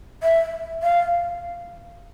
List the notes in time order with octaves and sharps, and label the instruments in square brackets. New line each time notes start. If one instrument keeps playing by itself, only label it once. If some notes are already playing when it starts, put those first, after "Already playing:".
[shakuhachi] E5
F5